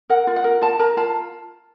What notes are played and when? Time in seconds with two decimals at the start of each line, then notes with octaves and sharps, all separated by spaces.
0.10 A#4 F#5
0.27 F4
0.36 F#5
0.44 A#4
0.61 F4 A5
0.79 A#4 A#5
0.97 F4 A5